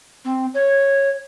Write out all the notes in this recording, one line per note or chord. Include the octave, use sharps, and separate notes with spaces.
C4
C#5